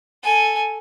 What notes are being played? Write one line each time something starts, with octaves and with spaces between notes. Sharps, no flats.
A4 G#5